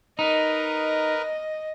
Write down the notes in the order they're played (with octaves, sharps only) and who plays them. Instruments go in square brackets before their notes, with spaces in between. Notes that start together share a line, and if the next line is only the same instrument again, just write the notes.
[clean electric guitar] D#4 [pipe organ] A#4 B4 [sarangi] D#5